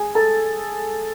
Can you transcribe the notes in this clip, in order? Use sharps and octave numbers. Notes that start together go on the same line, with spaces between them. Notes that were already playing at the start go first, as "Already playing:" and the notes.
Already playing: G#4 G#5
A4 A5